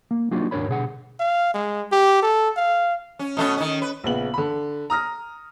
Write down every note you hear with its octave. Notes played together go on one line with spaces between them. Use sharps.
A#3
F#3 A#3 D4 D#4 F4 F#4
D#2 G#2 D4 A#4 C#5 B5
B2 D3 G#4 F#5
F5
G#3
G4
A4
F5
C#4
B2 A3 C#4
D#3 C#4
B4
A#1 C#3 B3 F#7
D3 B5
A#5 D#6 F6 A#6